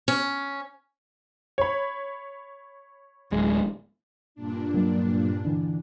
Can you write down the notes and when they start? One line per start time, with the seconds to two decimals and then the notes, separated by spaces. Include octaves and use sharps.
0.08 C#4
1.58 C#5 B5
3.32 D1 G#3
4.35 G2 A#2 D4
4.74 F#3 G3 A#3
5.45 D3 E3 D4